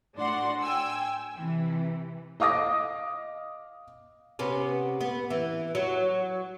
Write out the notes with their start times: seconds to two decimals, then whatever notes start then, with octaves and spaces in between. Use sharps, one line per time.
0.16 A2 D4 F#4 D5 F#5 C6
0.61 G5 G#5 E6
1.37 C3 E3
2.40 D#5 F5 D6 D#6 A#6
4.39 C3 B3 C#4
5.01 B3
5.30 E3
5.75 F#3